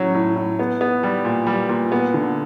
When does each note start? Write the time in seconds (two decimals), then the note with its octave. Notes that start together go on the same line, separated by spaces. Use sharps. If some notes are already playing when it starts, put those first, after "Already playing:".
Already playing: A2 F#3 C#4
0.14 A2
0.36 A2
0.59 B3
0.81 B3
1.03 G3
1.25 A#2
1.47 G3
1.69 A#2
1.92 B3
2.14 D3